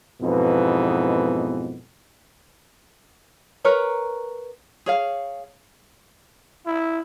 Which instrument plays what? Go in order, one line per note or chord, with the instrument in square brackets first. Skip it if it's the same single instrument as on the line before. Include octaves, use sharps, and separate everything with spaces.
[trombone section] F2 G#2 B2 E3 B3 D#4
[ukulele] A#4 B4 C#5 A#5
G#4 C#5 F5
[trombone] E4